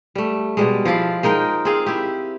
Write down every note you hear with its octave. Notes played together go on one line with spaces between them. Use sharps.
G3 A3
B2 G3 G#3
F3 E4 F4 D5
G#3 D#4 A#4 G5
C4 G#4 F5
E4 G4